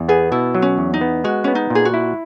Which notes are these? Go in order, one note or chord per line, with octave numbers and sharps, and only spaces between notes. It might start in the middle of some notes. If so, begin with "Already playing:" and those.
Already playing: E2
B3 G#4
B2 E4
F#3
C#4
E2
D#4
B3
G#3 F#4
B3 C#4
D#4
A#2 G#4
F#4
E4